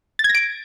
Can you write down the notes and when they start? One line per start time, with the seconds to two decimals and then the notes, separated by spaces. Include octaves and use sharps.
0.19 A6
0.24 G#6
0.29 A#6
0.35 D7